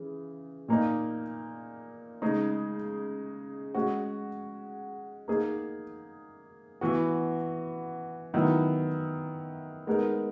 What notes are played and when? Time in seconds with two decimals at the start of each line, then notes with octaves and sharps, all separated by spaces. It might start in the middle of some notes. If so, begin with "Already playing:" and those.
Already playing: C#3 E3
0.68 A#2 A#3 D#4
2.22 C#3 G#3 D#4 G#4
3.75 G#3 C#4 F#4
5.28 A#3 D#4 G#4
6.81 E3 B3 F#4
8.33 D#3 F#3 B3 E4
9.87 G#3 B3 D#4 A#4